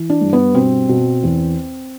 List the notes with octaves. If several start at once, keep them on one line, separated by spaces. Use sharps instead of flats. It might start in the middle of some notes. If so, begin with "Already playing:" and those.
Already playing: E3
D4
G2
B3
B2 C4
B2
E2